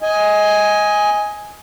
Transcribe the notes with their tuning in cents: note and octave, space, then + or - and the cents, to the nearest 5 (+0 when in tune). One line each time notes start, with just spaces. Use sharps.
D#5 +20 G#5 +0